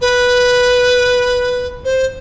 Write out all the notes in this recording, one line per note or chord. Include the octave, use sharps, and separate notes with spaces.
B4
C5